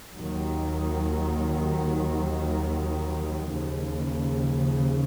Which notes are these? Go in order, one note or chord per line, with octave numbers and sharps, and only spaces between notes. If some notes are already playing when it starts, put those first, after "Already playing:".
D#2 D#3 F#3
D#2 C#3 F3